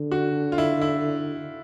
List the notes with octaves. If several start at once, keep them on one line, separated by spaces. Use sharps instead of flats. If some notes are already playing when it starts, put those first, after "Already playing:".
Already playing: D3
F#4
F4
E4
E4